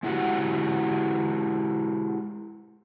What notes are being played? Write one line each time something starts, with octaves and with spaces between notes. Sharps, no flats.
G#3 E4 F#4 G4 F#5